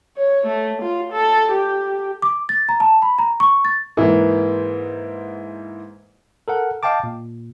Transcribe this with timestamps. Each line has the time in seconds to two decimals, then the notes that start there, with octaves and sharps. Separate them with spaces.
0.17 C#5
0.46 A3
0.82 F4
1.12 A4
1.51 G4
2.22 D6
2.49 A6
2.69 A#5
2.80 A5
3.02 B5
3.19 A#5
3.40 C#6
3.65 A6
3.97 G#2 E3 A#3 E4
6.48 A4 A#4 F#5
6.83 D#5 F5 G5 A5 D6
7.04 A#2